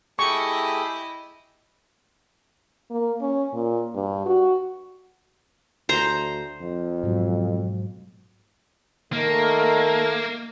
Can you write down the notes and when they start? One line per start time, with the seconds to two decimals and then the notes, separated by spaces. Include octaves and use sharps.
0.19 A3 E4 G4 G#4 D#5 C#6
2.90 A#3
3.21 C#4
3.53 A#2
3.95 G2
4.26 F#4
5.89 D2 C5 A#5
6.61 F2
7.03 G#2 B2 F#3
9.13 D#3 A3 A#3